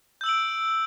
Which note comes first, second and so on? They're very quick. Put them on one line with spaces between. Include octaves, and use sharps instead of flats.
G6 E6 F#7 D7